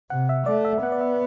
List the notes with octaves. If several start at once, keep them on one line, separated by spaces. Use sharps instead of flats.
C3 F#5
E5
A3 D5
E5
B3 F#5
D5
E5